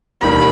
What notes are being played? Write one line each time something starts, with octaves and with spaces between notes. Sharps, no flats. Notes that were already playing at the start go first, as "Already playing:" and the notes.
E1 D#2 D#3 G3 B5